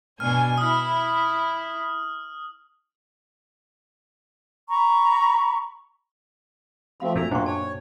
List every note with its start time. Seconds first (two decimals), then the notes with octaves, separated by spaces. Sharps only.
0.20 B2 D4 G#5 F6
0.58 E4 D#6 F6
4.70 A#5 B5 C#6
7.00 F3 A3 C4 F#4 F5 B5
7.16 A#2 A3 D4 E4 A4 A#5
7.31 F#2 A#2 A#3 D4 C5 G5 C#6
7.46 C#5 A5